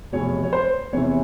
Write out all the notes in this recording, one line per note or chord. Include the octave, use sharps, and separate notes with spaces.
F1 E2 B2 C#5
C#5
C5
E2 C3 E3 C#5